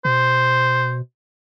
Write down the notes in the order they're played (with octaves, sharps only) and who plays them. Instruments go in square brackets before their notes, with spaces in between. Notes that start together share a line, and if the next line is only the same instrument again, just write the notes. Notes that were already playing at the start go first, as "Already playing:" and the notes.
[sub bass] B2 [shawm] C5